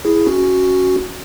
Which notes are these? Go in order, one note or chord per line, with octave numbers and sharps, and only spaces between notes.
E4 G#4
C#4 F#4